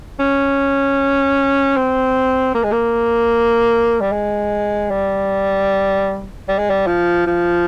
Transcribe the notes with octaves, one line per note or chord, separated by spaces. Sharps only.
C#4
C4
A#3
G#3
A#3
G3
G#3
G3
G3
G#3
G3
F3
F3